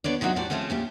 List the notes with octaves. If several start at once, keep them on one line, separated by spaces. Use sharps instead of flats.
B3 D4 C#5 D5
C3 F#3 D#4 E4 F#4
A2 G3 F#4 C5 D5
F3 G#3 A3 C4 C#4
A#2 C#3 G4